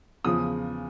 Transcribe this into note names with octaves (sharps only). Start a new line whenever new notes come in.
E2 C#3 F3 D#6